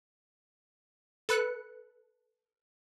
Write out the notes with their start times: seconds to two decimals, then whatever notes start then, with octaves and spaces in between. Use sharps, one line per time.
1.29 A4 B4 F#6 C#7